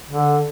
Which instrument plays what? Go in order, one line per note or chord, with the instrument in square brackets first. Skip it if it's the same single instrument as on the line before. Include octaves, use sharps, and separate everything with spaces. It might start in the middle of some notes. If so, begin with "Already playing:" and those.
[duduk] D3